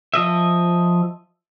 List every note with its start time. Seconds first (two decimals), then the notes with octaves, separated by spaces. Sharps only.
0.14 F3 D#5 E5